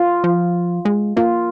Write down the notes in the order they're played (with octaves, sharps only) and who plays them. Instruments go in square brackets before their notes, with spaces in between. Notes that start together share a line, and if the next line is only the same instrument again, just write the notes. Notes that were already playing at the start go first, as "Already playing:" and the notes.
Already playing: [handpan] F4
[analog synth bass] F3
G#3
[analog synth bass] A#3 [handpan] F4